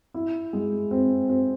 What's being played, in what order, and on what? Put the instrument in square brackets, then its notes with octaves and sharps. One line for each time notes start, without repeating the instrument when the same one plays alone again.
[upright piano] E4
G#3
C4
C4